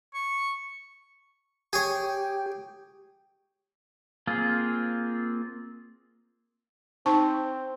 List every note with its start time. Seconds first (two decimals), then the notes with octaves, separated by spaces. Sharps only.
0.15 C#6
1.73 G4 G#4 C#5
4.27 A#3 C4 F4 G#4
7.06 C4 D#4 A5 C#6